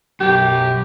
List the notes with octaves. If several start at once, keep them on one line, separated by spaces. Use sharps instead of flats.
B1 F#2 G4